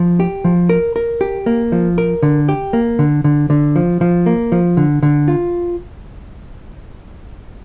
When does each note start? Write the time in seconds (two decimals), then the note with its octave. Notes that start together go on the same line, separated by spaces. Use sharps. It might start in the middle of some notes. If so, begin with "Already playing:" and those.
Already playing: F3
0.20 G4
0.44 F3
0.69 A#4
0.96 A#4
1.21 G4
1.46 A#3
1.72 F3
1.98 A#4
2.23 D3
2.49 G4
2.73 A#3
2.99 D3
3.24 D3
3.50 D3
3.76 F3
4.01 F3
4.26 A#3
4.52 F3
4.77 D3
5.03 D3
5.28 F4